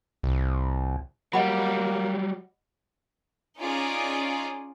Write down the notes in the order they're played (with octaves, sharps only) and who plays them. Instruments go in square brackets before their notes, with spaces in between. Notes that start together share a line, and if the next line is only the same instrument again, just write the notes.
[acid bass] C2
[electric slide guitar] F#3 G3 [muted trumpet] A#3 [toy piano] D#5 F#5 B5
[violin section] C#4 D#4 F4 G#4 D5